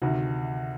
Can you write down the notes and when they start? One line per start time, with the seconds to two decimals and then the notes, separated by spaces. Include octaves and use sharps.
0.02 D2 C3 D#3